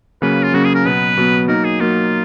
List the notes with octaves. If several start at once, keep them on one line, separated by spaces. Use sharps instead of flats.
C#3 F#3 A#3 C#4 B4
F4
C#3 F#3 A#3 C#4 F#4
G#4
A#4
B2 F#3 B3 B4
B2 F#3 B3
F#3 A#3 D#4 A#4
G#4
F#3 A#3 D#4 F4